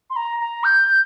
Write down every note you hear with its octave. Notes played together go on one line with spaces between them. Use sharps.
C6
A#5
A#5
G6